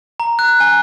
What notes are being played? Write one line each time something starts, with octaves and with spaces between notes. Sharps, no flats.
A#5
F#6
G#5